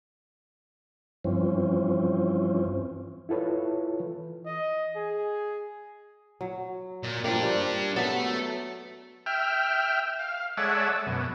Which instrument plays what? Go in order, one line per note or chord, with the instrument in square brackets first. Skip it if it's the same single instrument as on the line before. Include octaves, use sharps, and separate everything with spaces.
[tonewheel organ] G2 E3 F3 C4 C#4
[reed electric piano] E4 F4 A4 B4 C#5
E3
[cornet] D#5
G#4
[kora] F#3
[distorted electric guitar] A#2
[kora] F3 A#3 [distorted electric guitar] D4 G4
[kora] G3
[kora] F#3 B3 [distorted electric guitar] A4 E5
[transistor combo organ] E5 G5 F6
F5
G#3 A4 C#5 D5 E5 F#5
F#2 B2